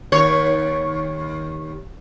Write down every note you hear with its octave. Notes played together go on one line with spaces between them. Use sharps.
D#2 C#5